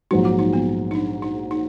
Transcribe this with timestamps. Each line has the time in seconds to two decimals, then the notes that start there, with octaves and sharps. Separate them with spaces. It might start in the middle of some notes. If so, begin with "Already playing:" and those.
0.11 A#1 G#2 F#3 D#4
0.25 F4
0.39 D#4
0.53 B3
0.91 D#4
0.95 D4
1.22 D#4
1.51 D#4